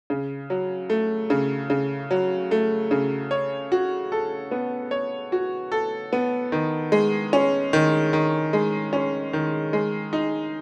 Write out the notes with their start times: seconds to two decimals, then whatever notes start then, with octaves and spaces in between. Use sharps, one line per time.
0.10 C#3
0.50 F#3
0.90 A3
1.30 C#3
1.70 C#3
2.11 F#3
2.51 A3
2.91 C#3
3.31 C#5
3.72 F#4
4.12 A4
4.51 B3
4.91 C#5
5.32 F#4
5.72 A4
6.13 B3
6.52 D#3
6.92 G#3
7.33 C#4
7.73 D#3
8.13 D#3
8.53 G#3
8.93 C#4
9.33 D#3
9.73 G#3
10.13 D#4